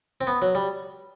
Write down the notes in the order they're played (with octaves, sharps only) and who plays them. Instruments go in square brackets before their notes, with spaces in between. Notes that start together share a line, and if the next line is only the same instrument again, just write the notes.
[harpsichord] C4
B3
F#3
G3